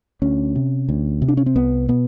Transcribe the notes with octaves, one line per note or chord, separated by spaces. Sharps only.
D2 C#4
C3
D2
C3
D4
C#4
C4
C2 B3
B2 B3